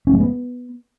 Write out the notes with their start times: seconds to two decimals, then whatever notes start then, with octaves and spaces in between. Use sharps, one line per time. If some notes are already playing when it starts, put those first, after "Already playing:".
0.07 C#4
0.14 G#3
0.20 B3